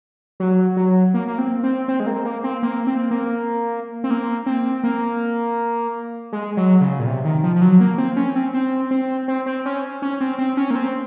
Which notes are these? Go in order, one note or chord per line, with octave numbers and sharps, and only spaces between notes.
F#3
F#3
A#3
A#3
C4
C4
C4
G#3
A#3
A#3
C4
A#3
C4
A#3
C4
A#3
C4
A#3
G#3
F#3
C#3
A#2
C3
D#3
F3
F3
F#3
A#3
C4
C#4
C4
C4
C4
C4
C4
C#4
C#4
C4
C4
C#4
A#3
C4